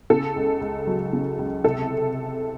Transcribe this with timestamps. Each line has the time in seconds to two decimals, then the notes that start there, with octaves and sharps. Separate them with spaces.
0.10 C#3 A4
0.36 C#2
0.61 C#2
0.87 F#3
1.13 C#3
1.38 C#2
1.64 C3 A4